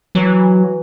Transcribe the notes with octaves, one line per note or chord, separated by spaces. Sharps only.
E3 F#3